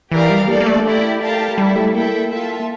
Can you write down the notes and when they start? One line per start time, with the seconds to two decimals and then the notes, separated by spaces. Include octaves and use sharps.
0.11 E3 G4 A#4 D5 F5
0.30 G3
0.47 A#3 D4 A4 D5
0.60 A#3
0.66 A3
0.84 E4 G4 D5
1.21 G4 A#4 F5 A5
1.57 G3 E4 A4 E5
1.76 A3
1.94 A#3 E4 A4 E5 G5
2.31 F4 A4 E5 A5